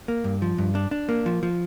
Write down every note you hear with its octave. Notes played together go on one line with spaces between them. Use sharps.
A#3
G2
F3
G2
D4
D4
A#3
F3
F3